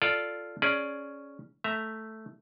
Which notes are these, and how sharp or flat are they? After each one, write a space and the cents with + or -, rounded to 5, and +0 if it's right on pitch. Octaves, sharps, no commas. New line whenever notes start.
F4 +0 A4 +0 D5 +0
C#4 +0 G#4 +10 D5 +0
A3 +0 E5 +0 A#5 +0